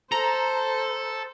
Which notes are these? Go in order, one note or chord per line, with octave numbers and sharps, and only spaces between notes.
A4 C5 A#5